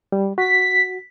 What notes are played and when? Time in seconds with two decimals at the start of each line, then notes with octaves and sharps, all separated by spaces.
0.12 G3
0.38 F#4 B6